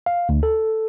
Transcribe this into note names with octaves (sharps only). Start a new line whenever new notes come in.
F5
D2
A4